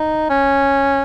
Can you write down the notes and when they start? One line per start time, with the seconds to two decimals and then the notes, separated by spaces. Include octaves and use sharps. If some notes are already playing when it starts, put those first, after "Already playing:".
Already playing: D#4
0.30 C#4